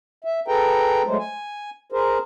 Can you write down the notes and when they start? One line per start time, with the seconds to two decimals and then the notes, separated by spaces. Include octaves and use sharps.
0.24 E5
0.48 G#4 A4 B4 G5 A#5
1.07 F#3 G#3 A3 C5
1.19 G#5
1.92 G#4 A#4 C5